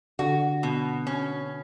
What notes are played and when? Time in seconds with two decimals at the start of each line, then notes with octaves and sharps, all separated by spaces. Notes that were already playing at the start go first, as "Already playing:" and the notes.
0.19 D3 F#4
0.63 B2
1.07 C#4